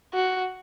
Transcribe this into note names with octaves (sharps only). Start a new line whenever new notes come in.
F#4